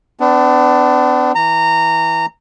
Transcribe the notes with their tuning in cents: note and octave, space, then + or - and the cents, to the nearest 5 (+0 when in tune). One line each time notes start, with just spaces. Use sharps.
B3 +45 D4 +0
E3 -15 A#5 -20